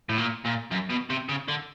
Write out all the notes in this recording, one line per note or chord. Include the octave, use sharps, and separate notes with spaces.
A2
A#2
A#2
F#2
B2
C3
C#3
D3